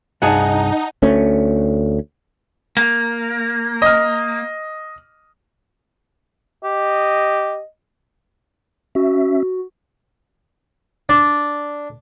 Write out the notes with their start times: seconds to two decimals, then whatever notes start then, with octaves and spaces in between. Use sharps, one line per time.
0.22 C2 G2 D#4 G#4 F#5 A5
1.03 D2 A3 C#4
2.77 A#3
3.82 D#5 F6
6.64 G4 D#5
8.95 C#4 F#4 E5
11.09 D4